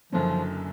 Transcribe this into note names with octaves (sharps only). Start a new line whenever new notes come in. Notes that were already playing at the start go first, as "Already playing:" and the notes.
F#1 F#2 D3 F3 F#3